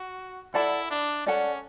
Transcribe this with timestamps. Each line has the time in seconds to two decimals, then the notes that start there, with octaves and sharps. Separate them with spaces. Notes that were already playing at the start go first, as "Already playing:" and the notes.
Already playing: F#4
0.54 E4 A4 D5 F#5 A5
0.91 D4
1.26 C#4 A4 D5 F#5 A5